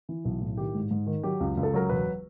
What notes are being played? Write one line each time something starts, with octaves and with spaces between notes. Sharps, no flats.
E3
B1
A2
D#3 G4
G#2
G#2
D#3
F#3 G4
C#2
C#2
A4
F#3 A#4
E1 B4